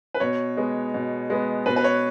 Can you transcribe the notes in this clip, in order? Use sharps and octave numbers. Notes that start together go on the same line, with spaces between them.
B4
B2 C#5
G#3 B3
B2
G#3 B3
B2 B4
B4
C#5